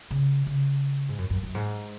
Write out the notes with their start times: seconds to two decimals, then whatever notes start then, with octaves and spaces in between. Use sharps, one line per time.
0.11 C#3
0.46 C#3
1.09 G#2
1.18 F#2
1.30 F#2
1.43 F#2
1.55 G#2